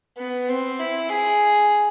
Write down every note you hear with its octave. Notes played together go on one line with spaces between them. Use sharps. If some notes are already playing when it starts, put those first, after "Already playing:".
B3
C4
E4
G#4